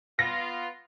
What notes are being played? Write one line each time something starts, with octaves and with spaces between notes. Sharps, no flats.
B3 F4 A#6